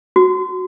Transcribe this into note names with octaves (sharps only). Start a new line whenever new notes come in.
F#4